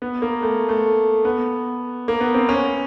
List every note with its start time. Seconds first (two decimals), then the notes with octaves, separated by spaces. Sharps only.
0.02 B3
0.22 A#3
0.43 A3
0.69 A3
1.25 B3
2.08 A#3
2.21 B3
2.34 C4
2.49 C#4